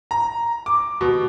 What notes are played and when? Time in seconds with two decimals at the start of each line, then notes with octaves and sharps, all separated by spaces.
0.11 A#5
0.66 D6
1.01 B2